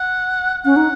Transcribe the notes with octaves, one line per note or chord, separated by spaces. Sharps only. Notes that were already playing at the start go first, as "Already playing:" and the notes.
Already playing: F#5
C#4 F#5
D#4